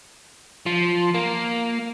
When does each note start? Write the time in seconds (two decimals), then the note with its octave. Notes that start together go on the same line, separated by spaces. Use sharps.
0.66 F3
1.14 A#3